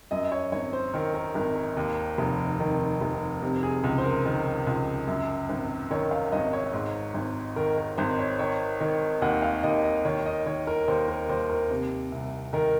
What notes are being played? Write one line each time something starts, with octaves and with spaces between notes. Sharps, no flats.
F#2 D#5
C#5
G#1 C#5
C5
D#3 A#4
A#4
G#1 A#4
A#4
D#2
F1
D#3
F1
C3
G#4
C#2
C5
A#4
D#3
C#2
F#2
G#1
D#3 C#5
F5
G#1 D#5
C#5
G#2
G#1
D#3 A#4
A#4
G#1 C5
C#5
D#3 C#5
D#3
D#2 F#5
F5
D#2 D#5
D#5
D#3 C#5
D#5
D#3 C#5
A#4
D#2 C5
A#4
D#2 C5
A#4
C3
C2
D#3 A#4